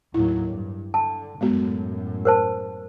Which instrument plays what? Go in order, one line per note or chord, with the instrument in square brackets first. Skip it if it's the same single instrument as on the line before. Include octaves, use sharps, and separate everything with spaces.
[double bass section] D#2 A2 F#3 [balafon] E4
[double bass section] G2
[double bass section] D3 [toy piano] A5
[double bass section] F#2 A2 [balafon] G#3 B3 F#4
[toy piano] A#4 C5 A5